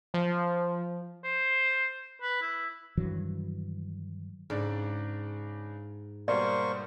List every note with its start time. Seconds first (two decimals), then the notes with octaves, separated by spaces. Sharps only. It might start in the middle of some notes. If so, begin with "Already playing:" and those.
0.14 F3
1.24 C5
2.22 B4
2.42 E4
2.97 G2 D#3 E3 F#3
4.50 G#2 C#3 D4 D5
6.28 B2 G3 A#3 C5 D5 C#6